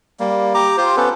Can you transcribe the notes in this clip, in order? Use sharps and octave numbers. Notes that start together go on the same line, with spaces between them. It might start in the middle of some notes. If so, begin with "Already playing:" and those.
G3 A#3
G4 A#5 D6
F4 G4 C5
B3 C#4 A4 B4